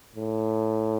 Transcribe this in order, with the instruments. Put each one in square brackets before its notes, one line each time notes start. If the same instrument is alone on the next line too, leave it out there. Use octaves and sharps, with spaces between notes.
[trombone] A2